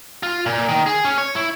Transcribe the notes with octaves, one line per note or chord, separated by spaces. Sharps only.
F4
A#2
D#3
G#4
C#4
C#5
E4